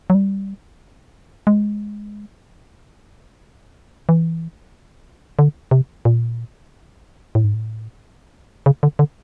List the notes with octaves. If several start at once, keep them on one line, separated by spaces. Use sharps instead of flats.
F#3
G3
G#3
E3
D3
C3
A#2
A2
G#2
A2
C#3
D3
D3